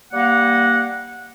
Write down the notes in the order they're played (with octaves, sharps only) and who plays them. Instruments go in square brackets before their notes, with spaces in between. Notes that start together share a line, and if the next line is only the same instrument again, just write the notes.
[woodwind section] G3 A#3 F#5